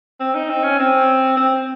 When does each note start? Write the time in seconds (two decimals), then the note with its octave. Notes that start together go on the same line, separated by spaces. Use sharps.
0.20 C4
0.35 D#4
0.49 C4
0.63 C#4
0.79 C4
1.37 C4